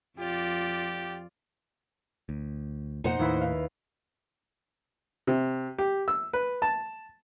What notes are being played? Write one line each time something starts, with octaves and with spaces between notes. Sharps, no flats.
F2 F4 G4 D5
D2
F2 B2 A#3 D#4 C5 F#5
D#2 A2 E4 B4
F5
C3
G4
E6
B4
A5